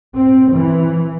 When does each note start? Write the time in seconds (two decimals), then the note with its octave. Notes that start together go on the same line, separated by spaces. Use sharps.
0.17 C4
0.52 E3